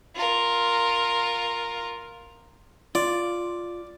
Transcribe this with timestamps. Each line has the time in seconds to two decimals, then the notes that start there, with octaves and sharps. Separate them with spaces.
0.15 F4 A#4
2.95 F4 D5